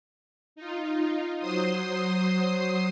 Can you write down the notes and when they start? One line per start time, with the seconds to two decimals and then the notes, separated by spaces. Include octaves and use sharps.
0.56 D#4 F4
1.39 F#3 C5 C6 D#6